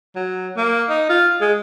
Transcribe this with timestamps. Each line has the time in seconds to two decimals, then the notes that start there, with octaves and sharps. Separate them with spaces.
0.16 F#3
0.57 A#3
0.89 D#4
1.09 F4
1.41 G#3